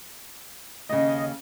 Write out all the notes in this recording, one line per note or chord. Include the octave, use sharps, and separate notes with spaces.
D#2 C#3 D#5